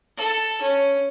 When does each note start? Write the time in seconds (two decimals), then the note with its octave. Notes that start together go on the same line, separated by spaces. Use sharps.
0.17 A4
0.61 C#4